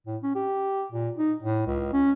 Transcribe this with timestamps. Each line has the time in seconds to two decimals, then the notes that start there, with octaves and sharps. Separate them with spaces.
0.07 A2
0.23 C#4
0.35 G4
0.92 A#2
1.18 D#4
1.42 A2
1.67 C#2
1.93 C#4